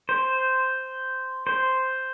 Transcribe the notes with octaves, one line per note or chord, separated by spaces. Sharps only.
C5
C5